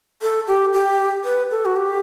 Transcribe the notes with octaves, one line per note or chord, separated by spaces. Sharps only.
A4
G4
G4
B4
A4
F#4
G4